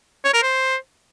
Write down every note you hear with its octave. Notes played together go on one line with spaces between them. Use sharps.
C#5
A#4
C5